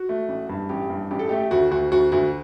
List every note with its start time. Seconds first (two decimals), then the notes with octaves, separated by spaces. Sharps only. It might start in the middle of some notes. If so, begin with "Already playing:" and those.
Already playing: F#4
0.09 A3
0.29 A1
0.49 G2
0.69 A1 G4
0.90 G2
1.11 A1 G4
1.19 A4
1.29 A3 G4
1.51 D2 F#4
1.71 D2 F#4
1.91 D2 F#4
2.12 D2 F#4